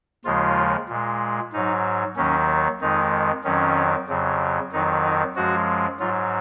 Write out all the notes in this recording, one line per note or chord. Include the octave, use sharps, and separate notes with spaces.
D#2 C#3 F3 G#3 F4
A#2 G#3
G#2 F#3 D#4
D#2 D#3 F#3 C#4
F2 D#3 G#3 D#4
F2 D#3 F#3 C#4
F2 C#3 F#3
F2 D#3 F#3 D#4
D#4
F#2 F3 G#3 F#4
G#2 F#3 F4